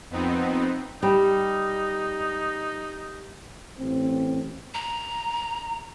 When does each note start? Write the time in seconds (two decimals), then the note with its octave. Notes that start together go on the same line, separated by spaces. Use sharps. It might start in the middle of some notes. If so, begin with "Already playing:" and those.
0.10 F2 B3 C4 D#4
1.03 G3 D#4
3.79 A1 C4
4.74 A#5